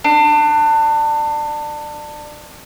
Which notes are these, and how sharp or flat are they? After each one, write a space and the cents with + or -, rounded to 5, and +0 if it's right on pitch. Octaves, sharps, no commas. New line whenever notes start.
D4 +25